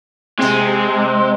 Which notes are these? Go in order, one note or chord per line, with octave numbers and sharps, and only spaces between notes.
C3 G#3 C4